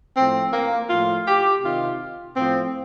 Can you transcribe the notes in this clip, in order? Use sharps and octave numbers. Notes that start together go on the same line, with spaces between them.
A2 F3 C4
A#3
A2 F3 F4
G4
C3 D#3 F4
A2 F3 C4